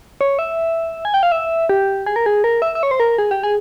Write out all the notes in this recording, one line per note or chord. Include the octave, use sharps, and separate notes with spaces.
C#5
E5
G#5
G5
F5
E5
G4
G#4
A#4
G#4
A#4
E5
E5
C#5
C5
A#4
G#4
G4
G#4